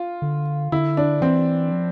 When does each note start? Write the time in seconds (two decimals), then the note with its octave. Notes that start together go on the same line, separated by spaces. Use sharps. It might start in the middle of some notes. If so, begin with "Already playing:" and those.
Already playing: F4
0.22 D3
0.72 D3 E4
0.97 D4
1.21 E3 C4
1.72 F3